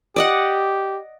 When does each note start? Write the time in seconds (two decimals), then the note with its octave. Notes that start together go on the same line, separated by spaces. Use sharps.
0.16 G4 D5 D#5 F#5